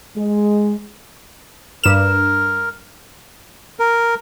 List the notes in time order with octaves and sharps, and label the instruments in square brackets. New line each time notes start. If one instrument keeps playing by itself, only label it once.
[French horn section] G#3
[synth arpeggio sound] G2 E7 [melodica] A#4
[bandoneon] A#4